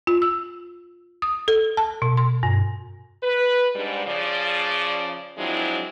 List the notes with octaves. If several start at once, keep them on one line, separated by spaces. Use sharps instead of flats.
F4
E6
D#6
A4
A5
B2
C6
G2
B4
G#2 G3 D4
C#3 F3 D5
F3 F#3 G#3 C4 D4 E4